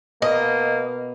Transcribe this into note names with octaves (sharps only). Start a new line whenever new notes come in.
B2 A#3 D#5